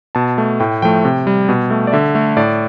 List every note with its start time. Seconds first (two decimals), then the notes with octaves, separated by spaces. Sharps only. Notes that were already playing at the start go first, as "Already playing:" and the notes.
0.15 B2 A5
0.38 A3
0.60 A2 G5
0.82 F3 A3 G5
1.05 C3
1.27 G3
1.49 B2
1.70 A3
1.87 D5
1.92 D3 E5
2.15 A3
2.37 A2 D5